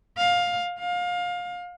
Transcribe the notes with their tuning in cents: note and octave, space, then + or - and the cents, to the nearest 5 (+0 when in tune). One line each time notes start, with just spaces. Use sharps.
F5 +15
F5 +25